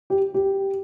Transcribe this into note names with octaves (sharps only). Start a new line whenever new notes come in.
G4
G4